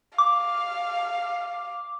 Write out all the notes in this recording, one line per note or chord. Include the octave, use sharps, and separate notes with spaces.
F5 D6